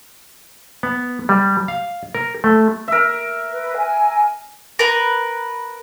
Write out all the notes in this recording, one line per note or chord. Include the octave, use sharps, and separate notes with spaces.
B3
G3
F5
A#4
A3
A#4 E5
B4
G#5
A#4 B4